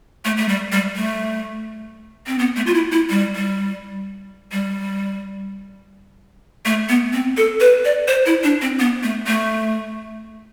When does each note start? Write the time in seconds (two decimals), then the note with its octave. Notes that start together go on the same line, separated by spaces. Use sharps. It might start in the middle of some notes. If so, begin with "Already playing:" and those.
0.25 A3
0.37 A3
0.49 G3
0.72 G3
0.96 A3
2.27 C4
2.39 B3
2.56 A3
2.67 F4
2.74 E4
2.92 E4
3.10 G3
3.36 G3
4.52 G3
6.65 A3
6.89 B3
7.13 C4
7.37 A4
7.60 B4
7.85 D5
8.08 C5
8.26 E4
8.43 D4
8.62 C4
8.79 B3
9.03 A3
9.27 A3